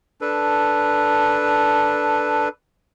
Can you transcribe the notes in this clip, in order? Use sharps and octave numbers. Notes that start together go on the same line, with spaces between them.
D4 A4 B4